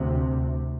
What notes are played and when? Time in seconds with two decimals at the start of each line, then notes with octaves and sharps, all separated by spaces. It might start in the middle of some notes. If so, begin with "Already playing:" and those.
Already playing: D2 C3